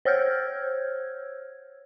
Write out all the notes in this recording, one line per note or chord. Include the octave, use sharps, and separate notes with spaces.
C5 C#5 E6 F6 G6 G#6